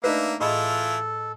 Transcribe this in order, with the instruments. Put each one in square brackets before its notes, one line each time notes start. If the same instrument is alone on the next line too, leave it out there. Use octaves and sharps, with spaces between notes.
[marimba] A3 [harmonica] A#3 E5 [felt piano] D4 D#4 B4
[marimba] A2 G#4 D#6 [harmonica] E3 E4 F4 [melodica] A4 [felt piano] D#5